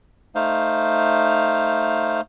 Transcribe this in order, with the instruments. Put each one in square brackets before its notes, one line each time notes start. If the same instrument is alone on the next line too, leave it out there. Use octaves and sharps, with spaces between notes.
[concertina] A3 D#4 C5 F5